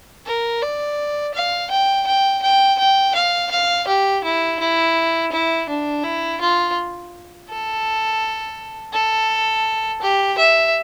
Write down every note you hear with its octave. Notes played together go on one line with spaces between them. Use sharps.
A#4
D5
F5
G5
G5
G5
G5
F5
F5
G4
E4
E4
E4
D4
E4
F4
A4
A4
G4
E5